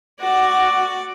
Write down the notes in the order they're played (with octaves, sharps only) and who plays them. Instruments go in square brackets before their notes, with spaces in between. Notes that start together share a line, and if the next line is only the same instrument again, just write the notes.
[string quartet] F#4 [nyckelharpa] D5 D6